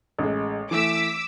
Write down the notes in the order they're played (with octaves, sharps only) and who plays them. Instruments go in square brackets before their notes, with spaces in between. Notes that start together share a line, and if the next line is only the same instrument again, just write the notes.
[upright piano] A1 G#3
[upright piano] E3 A3 [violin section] D6 E6 B6